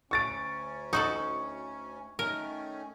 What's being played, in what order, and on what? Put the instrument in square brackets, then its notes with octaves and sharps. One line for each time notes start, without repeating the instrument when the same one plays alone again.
[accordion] D2 C#4 [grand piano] C#6 A6 D7
[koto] D#4 F#4 A4 [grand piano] C#6
[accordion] D#3 A3 C#4 [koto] A#4